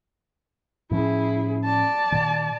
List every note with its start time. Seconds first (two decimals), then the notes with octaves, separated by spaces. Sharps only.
0.91 A2 F3 C#4 E4 G#4
1.65 D5 A5
2.12 A#2 D#3